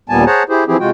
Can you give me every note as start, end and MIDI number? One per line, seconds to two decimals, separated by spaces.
0.10 0.25 39
0.10 0.25 46
0.10 0.25 55
0.10 0.25 59
0.10 0.25 80
0.10 0.25 81
0.26 0.43 68
0.26 0.43 72
0.26 0.43 73
0.26 0.43 78
0.26 0.43 81
0.26 0.43 82
0.49 0.64 64
0.49 0.64 67
0.49 0.64 68
0.49 0.64 72
0.67 0.77 52
0.67 0.77 53
0.67 0.77 60
0.67 0.77 64
0.67 0.77 67
0.67 0.77 68
0.80 0.90 48
0.80 0.90 56
0.80 0.90 65
0.80 0.90 66
0.80 0.90 79